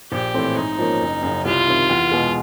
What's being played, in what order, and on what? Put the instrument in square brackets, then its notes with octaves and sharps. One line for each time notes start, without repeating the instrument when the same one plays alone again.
[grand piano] A#1 [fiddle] G4
[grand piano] A2 E3 A3 C4
[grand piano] G#2 [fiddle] D#4
[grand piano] F3 A#3 C#4
F#1
F#2 C#3
[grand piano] C2 [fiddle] F4
[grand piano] C3 D#3
E2
B2 G#3